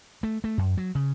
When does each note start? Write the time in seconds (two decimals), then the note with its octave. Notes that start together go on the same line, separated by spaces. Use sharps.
0.23 A3
0.44 A3
0.58 F#2
0.78 F#3
0.95 C#3